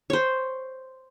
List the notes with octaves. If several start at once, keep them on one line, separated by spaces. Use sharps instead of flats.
C5 C#5